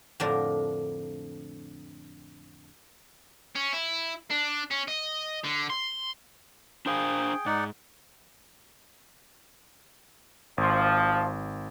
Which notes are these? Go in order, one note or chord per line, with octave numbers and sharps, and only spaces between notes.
F2 A2 D3 F3 D4 A#4
C#4
E4
D4
C#4
D#5
D3
C6
D4 G#4 C5 F5 G5
G#2 D#4 D5 F#5
G#1 F3